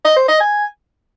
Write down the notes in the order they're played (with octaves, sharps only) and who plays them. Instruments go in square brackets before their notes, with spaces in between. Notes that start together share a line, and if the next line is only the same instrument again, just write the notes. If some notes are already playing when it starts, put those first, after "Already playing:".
[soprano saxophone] D#5
C5
D#5
G#5